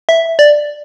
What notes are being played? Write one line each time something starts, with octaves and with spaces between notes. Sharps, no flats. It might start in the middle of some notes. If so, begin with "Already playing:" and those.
E5
D5